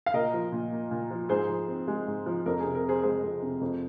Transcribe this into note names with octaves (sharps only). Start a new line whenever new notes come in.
F5
A#2 A#4 D#5
F3
A#2
A#3
A#2
F3
G#2 G#4 C5
F3
C4
G#3
G#2
F3
F2 A#4
C3 G#4
A#4
C4 G#4 C5
G#3 G#4 C5
F2
C3
F2